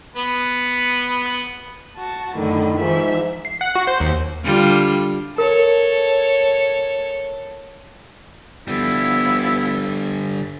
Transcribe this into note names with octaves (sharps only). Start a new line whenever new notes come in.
B3 B4
F#4 A5
F#2 A2 D3 D#3
G#2 E3 F3 E5
C7
F#5
F#4
C5
D#2
D3 G3 F4
A4 A#4 C#5
D3 F3 G3 B3 E4